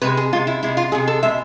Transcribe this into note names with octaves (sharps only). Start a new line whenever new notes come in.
C3 G#3 B4
G#4
C3 G#3 F4
E4
C3 G#3 E4
F4
C3 G#3 G#4
A4
B2 G#3 E5